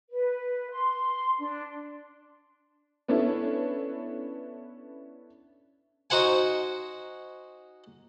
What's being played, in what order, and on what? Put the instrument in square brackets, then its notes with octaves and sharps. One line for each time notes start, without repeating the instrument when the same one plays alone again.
[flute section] B4
C6
D4
[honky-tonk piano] B3 C#4 D4 E4 A4
[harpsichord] D#4 F#4 C5 F#5 G#5